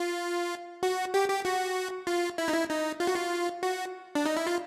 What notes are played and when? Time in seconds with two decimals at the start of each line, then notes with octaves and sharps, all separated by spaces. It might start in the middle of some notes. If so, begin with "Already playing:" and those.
Already playing: F4
0.83 F#4
1.14 G4
1.30 G4
1.45 F#4
2.07 F4
2.38 E4
2.48 D#4
2.54 E4
2.70 D#4
3.00 F4
3.07 F#4
3.15 F4
3.63 F#4
4.15 D4
4.25 D#4
4.37 E4
4.47 F4